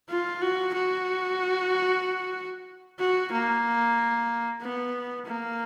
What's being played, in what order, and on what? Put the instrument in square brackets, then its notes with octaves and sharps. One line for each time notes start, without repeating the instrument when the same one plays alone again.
[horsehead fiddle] F4
F#4
F#4
F#4
A#3
B3
A#3